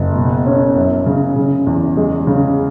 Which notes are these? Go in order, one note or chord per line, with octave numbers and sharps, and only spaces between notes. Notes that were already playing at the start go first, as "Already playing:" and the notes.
Already playing: F#1
B2
C#4
F#2
C#3
C#3
E2
G#3
C#3